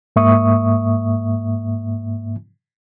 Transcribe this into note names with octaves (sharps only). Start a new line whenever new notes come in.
G#2 A#3 E5 C#6 D#6